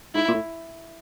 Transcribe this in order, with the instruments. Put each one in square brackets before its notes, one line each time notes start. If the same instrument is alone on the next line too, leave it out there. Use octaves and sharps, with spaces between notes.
[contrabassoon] G#2 [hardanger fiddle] E4
[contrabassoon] A#2
A2